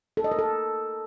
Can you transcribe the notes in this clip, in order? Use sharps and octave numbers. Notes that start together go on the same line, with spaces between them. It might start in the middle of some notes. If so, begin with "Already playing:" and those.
A4
D#5
A#4
A4